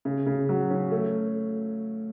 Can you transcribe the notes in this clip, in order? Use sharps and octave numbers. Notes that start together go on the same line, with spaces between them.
C#3
C#3
F#3
C#4
A3